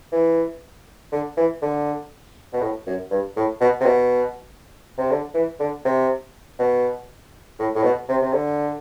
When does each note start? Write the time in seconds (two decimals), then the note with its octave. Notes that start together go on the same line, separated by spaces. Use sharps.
0.12 E3
1.12 D3
1.37 E3
1.62 D3
2.53 B2
2.62 A2
2.87 F#2
3.10 G2
3.36 A2
3.60 B2
3.80 C3
3.86 B2
4.98 C3
5.10 D3
5.34 E3
5.60 D3
5.85 C3
6.59 B2
7.59 A2
7.75 A2
7.83 B2
8.09 C3
8.22 C3
8.33 D3